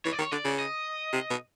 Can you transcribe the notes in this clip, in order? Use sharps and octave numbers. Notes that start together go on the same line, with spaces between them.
E3 C#5
D5
D#3 C#5
D3 D5
C#3
D#5
C3
B2